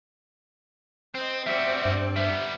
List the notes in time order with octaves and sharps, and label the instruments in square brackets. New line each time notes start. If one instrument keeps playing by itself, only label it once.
[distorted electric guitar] C4 [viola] C5 D#5
[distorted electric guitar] G3 F#4 [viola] C4 D5 [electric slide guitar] E5
[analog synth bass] G2
[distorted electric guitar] G3 B3 [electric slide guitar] E5